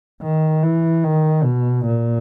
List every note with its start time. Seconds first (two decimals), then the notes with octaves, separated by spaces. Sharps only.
0.23 D#3
0.63 E3
1.04 D#3
1.44 B2
1.86 A#2